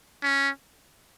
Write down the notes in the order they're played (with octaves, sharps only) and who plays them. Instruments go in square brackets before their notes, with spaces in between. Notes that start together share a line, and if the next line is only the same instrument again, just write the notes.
[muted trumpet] C#4